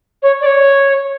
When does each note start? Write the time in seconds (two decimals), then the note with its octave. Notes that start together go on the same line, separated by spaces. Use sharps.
0.22 C#5
0.41 D5
0.46 C#5